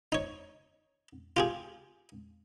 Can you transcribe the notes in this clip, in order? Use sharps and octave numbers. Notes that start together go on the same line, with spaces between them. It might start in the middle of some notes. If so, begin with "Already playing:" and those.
D#4 C#5
F4 G4 G#4